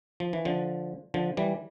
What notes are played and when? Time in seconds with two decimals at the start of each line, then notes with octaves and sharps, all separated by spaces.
0.20 F3
0.33 E3
0.45 D3 F3
1.14 D3 F3
1.37 E3 G3